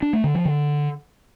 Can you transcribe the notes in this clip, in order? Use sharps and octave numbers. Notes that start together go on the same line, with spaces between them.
D4
A3
D3
F3
D3